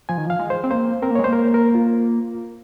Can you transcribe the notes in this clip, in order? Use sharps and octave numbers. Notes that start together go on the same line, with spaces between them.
F3 G#5
D#3
F3 F5
G#3
C5
C4
A#3 C5
C4 A#4
A#3
G#3 C#5
A#3 C5
A#4
A#4
F4